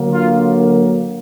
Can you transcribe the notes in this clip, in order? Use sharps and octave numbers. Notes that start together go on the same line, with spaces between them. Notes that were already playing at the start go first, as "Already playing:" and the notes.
Already playing: D3 F#3 A#3
F4